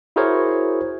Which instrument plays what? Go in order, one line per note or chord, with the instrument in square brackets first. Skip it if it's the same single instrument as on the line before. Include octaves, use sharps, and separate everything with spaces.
[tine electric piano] E4 F#4 G#4 A#4 C5 C#5